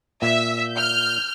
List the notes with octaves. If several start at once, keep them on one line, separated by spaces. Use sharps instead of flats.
A#2 E5
F6 G6